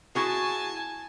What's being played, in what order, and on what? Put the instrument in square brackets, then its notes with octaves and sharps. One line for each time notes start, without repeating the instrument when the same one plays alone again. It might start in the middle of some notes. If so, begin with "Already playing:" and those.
[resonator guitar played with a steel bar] E4 F#4 G#4 [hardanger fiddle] G#5 A5